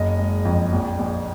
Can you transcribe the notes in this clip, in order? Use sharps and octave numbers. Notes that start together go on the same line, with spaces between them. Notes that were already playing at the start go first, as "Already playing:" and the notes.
Already playing: F#1 D#5
G#3
F2
A#1
A#1